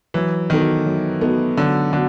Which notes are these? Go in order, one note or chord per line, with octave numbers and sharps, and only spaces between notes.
E3 F#3
D#3 B3 D#4 F#4 A4
F#3
B3 D#4 F#4 A4
D3 F#3
D3 B3 F#4